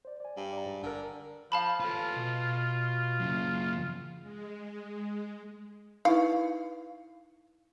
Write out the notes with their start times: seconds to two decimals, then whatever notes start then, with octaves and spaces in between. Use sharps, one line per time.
0.05 C5 D5
0.20 D5 G#5
0.37 G2
0.53 D5 G#5 A#5
0.66 G#2
0.83 G1 D3 A#4
1.52 F3 F5 A5 B5
1.80 F4 A4 B4
2.16 B2
3.20 F#2 C#3
4.21 G#3
6.05 D#4 E4 B4 F5